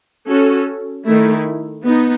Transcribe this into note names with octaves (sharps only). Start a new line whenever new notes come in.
C#4 F#4 A4
D#3 A3 E4
B3 D#4